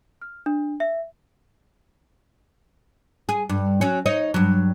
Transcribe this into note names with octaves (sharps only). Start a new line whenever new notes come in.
F6
D4
E5
G#4
G2
F#3 C#4
D#4 C#5 D#5
G2 F#3